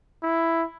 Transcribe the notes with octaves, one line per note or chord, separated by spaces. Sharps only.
E4